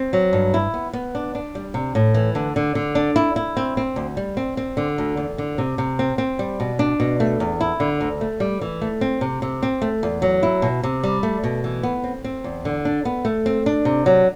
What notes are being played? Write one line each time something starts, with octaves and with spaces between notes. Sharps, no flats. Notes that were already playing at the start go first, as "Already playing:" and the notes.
Already playing: C4
F#3
G2
E4
B3
B3
D4
D4
G3
C3
A2
E3
D3
D3
D3
D4
E4
E4
C4
C4
D2
G3
C4
C4
D3
D2
E2
D3
C3
C3
C4
C4
G3
B2
D4
B2
A3
E2
E4
D3
D2
A3
G3
E3
A3
C4
C3
C3
C4
A3
E2
F#3
E4
B2
C3
G3
A3
B2
E3
B3
C4
C4
E2
D3
D4
B3
A3
C4
D4
C3
F#3